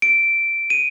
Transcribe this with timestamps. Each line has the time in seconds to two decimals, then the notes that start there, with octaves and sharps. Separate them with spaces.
0.02 D7
0.70 D#7